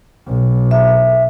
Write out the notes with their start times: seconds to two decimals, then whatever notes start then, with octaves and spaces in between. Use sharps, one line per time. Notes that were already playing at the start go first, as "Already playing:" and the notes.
0.26 B1
0.71 E5